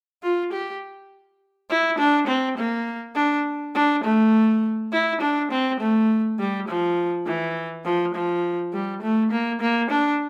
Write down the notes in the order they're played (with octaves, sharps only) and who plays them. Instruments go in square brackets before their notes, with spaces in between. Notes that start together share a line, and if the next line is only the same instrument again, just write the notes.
[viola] F4
G4
E4
D4
C4
A#3
D4
D4
A3
E4
D4
C4
A3
G3
F3
E3
F3
F3
G3
A3
A#3
A#3
D4